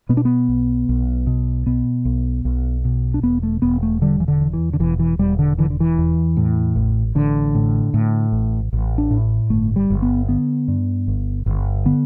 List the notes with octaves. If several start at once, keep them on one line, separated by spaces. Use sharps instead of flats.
B2 B3
D4
B3
B1
B1
B2
B2 B3
B1
B1
B2
D4
E1 B3
A3
E1 B3
A3
D3 G3
E3
D3
E2
E3
D3
E1 E3
E3
E1 G3
D3
D3 E3
D3
E3
E2
A2
A1
A1 D3
A2
A2
A1
A1
D4
A2
G1 A3
G3
G1
B3
D3 B3
G2
G1
G1
D3 B3